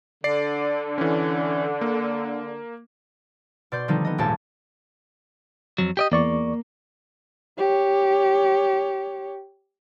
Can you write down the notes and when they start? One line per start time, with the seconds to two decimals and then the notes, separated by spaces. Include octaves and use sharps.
0.24 D3 D5 C7
0.98 E3 C#4
1.81 A#3
3.72 B2 D5 C6 G6
3.88 D3 D#3 F3 G3 C4 D#4
4.05 B3 D#5
4.18 G#1 D#2 A#2 G4 C#5 A5
5.78 F2 F#3
5.97 G4 D5 D#5
6.12 E2 A#3 D5 C#6
7.58 G4 C#5